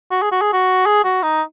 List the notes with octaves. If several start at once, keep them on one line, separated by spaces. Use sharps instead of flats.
F#4
G#4
F#4
G#4
F#4
G#4
F#4
D#4